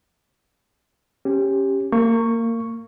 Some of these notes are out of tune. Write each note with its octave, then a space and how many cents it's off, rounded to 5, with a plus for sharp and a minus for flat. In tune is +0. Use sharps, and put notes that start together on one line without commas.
C#4 -15 G4 +0
A#3 -25 C#6 +0